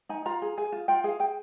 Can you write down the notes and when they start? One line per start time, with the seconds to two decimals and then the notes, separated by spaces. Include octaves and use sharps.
0.09 D#4 G#5
0.26 F4 A#5
0.42 G#4
0.58 G#4 G#5
0.72 F4
0.88 F4 G5
1.04 G#4 F5
1.20 G#4 G5